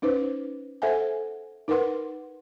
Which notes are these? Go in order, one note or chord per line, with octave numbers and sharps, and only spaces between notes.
C#4 D#4 B4 C5
A4 C5 E5 F#5 G#5
D#4 A#4 B4 F#5 C6